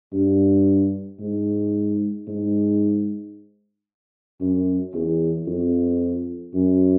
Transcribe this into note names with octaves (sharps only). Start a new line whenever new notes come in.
G2
G#2
G#2
F#2
E2
F2
F#2